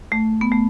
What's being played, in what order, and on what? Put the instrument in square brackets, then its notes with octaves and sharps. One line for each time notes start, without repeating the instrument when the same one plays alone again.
[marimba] A3
B3
A3